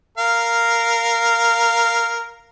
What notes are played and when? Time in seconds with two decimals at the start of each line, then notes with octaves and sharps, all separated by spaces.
0.18 A#4 F5